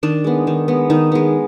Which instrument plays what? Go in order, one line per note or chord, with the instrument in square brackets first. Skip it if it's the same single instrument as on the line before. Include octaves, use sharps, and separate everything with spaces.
[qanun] D#3 D4
G#3 B3
D#3
G#3 B3
D#3 D#4
G#3 B3